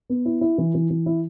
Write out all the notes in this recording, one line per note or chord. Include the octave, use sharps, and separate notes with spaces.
B3
E4
E4
E3
E3
E3
E4